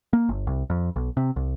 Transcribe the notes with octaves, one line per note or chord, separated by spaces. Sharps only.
A#3
G1
C2
F2
B1
C3
C2